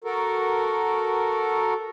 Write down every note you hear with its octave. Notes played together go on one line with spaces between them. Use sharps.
F#4 A4 A#4